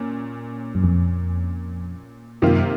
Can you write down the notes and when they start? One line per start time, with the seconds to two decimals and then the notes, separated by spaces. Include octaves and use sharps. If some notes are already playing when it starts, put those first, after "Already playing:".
Already playing: A#2 C#4
0.75 F#2
0.84 F2
2.42 F#2 C3 D#3 A#3 F4